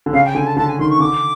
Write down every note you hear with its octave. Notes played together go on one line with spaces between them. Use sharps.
D3
C#3 F5
G5
D3 G#5
A5
D3 A5
G#5
D#3 C6
C#6
D3 D6